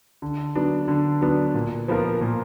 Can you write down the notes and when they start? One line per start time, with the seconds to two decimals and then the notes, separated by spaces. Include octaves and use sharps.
0.22 D3
0.55 F#3 B3 D4
0.88 D3
1.21 F#3 B3 D4
1.54 A#2
1.88 F3 B3 F4 A#4
2.21 A#2